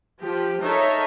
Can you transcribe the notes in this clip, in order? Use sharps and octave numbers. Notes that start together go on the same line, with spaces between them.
F3 G4
D#4 A4 A#4 C#5 E5